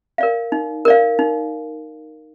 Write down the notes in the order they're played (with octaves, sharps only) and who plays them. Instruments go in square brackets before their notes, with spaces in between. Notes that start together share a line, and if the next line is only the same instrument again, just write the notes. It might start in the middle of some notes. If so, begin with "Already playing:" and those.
[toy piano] A#4 D5 F5
D#4
A#4 D5 F5
D#4